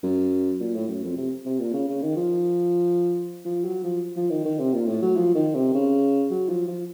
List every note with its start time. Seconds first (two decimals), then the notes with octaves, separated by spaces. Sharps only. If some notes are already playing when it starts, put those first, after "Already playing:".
0.03 F#2
0.60 A#2
0.74 A2
0.88 F#2
1.03 F2
1.17 C3
1.45 C3
1.60 A#2
1.73 C#3
1.89 C#3
2.02 D#3
2.16 F3
3.45 F3
3.64 F#3
3.84 F3
4.16 F3
4.30 D#3
4.45 D#3
4.59 C3
4.74 A#2
4.88 A2
5.02 F#3
5.16 F3
5.35 D#3
5.54 C3
5.74 C#3
6.30 F#3
6.49 F3
6.68 F3